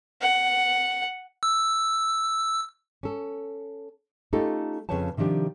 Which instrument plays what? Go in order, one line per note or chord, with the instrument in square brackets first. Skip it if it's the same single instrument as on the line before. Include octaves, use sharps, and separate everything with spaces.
[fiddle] F#5
[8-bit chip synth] E6
[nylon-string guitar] C#4 A4
A3 C#4 D#4 F4 G4 A4
F2 C#3 B4 C#5 G5 A5
C3 D#3 F3 D4 G4